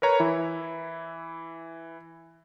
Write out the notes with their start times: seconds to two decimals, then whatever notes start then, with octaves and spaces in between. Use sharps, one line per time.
0.02 A#4 B4 C#5 A#5
0.20 E3 E4